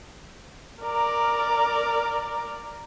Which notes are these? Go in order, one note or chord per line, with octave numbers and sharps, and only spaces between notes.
A#4 D5 A#5